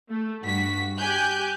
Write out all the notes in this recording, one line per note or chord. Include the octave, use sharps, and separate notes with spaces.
A3
G2 F#4 B6
G4 G#5 F#6 G6